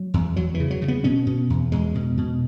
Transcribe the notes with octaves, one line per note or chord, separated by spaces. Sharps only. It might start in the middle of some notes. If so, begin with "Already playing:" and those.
Already playing: F#3
E2
E2 F#3
E3
C#3
F#3
C#3
B3
B2 C#4
B2
E2
E2 G#3
B2
B2